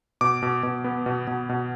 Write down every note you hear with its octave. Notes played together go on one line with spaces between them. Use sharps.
B2 D6
B2
B2
B3
B2
B2
B2